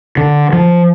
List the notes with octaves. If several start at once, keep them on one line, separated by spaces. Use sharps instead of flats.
D3
F3